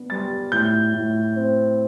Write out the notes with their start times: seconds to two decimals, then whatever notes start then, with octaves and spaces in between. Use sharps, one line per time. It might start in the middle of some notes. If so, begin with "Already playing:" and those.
Already playing: B3 D4
0.10 G3 A6
0.52 A2 G6
0.94 A2
1.36 C4